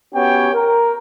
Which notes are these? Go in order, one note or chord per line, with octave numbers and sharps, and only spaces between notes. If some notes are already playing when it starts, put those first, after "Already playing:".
B3 C#4 F#4 G4 C#5 G5
A#4